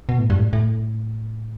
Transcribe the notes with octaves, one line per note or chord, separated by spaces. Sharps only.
B2
A2
G2
A2
A2